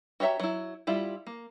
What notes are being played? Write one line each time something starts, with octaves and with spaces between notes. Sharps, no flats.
F#4 G4 C#5 E5 A#5
F#3 E4
G3 E4 F4
A#3